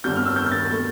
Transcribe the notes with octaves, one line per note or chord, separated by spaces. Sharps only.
G1 F2 D3 G3 G6
F6
E6
G6
G6
A6
B2 A3